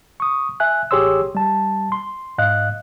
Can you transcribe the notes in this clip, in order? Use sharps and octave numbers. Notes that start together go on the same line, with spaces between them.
C#6 D#6
E5 G#5 F#6
A1 G4 G#4 C#5 C6 E6
G3 A5
C6
G#2 D#5 F5 F#6